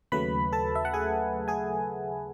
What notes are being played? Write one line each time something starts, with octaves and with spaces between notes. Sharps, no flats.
D#2 C#3 F#3 A3 B4 B5
A4 A5
E5
F#5
G#4 G#5
G#4 G#5